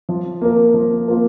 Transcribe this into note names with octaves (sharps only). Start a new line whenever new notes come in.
F3
A#3 F4 A#4
F3
A#3 F4 A#4